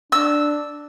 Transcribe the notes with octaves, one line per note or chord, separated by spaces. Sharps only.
D4 E6